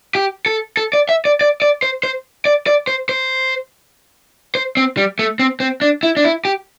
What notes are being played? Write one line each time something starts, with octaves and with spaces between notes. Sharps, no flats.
G4
A4
A4
D5
E5
D5
D5
D5
C5
C5
D5
D5
C5
C5
C5
C4
G3
A3
C4
C4
D4
E4
D4
E4
G4